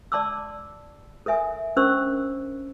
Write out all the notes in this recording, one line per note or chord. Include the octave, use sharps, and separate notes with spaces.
D5 A5 C6 D6 E6
A4 A#4 E5 G#5
C#4 D4 A#4 C5 C#6 E6